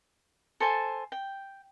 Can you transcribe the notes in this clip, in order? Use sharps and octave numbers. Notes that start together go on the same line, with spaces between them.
A4 C5 G#5 A5
G5